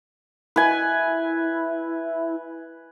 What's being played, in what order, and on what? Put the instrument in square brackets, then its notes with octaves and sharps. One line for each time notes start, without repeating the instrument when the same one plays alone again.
[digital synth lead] E4 [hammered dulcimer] B4 G#5